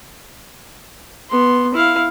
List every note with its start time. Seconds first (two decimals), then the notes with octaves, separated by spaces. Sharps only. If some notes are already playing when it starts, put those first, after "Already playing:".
1.30 B3 C6
1.74 E4 F5